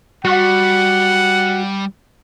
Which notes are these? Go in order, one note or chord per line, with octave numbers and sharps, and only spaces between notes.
G3 F#4 F#5